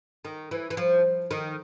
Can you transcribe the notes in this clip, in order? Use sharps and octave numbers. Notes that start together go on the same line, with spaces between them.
D#3
E3
E3
F3
D#3